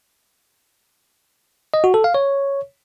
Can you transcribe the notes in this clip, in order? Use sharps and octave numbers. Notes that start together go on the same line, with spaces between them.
D#5
F#4
A4
F5
C#5